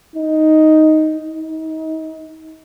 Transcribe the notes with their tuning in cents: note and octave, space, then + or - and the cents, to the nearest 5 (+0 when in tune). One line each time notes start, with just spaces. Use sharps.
D#4 +5
D#4 +35